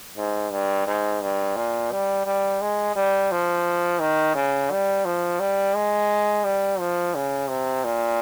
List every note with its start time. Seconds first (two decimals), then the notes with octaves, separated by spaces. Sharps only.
0.18 G#2
0.52 G2
0.87 G#2
1.23 G2
1.56 A#2
1.92 G3
2.26 G3
2.61 G#3
2.96 G3
3.32 F3
4.01 D#3
4.35 C#3
4.71 G3
5.05 F3
5.40 G3
5.76 G#3
6.44 G3
6.80 F3
7.15 C#3
7.49 C3
7.85 A#2